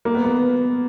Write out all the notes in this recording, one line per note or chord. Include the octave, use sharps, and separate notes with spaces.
A#3
B3
B3